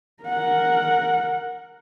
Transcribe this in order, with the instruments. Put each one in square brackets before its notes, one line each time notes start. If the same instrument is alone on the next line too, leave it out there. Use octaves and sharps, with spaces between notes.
[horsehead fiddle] A#4 F#5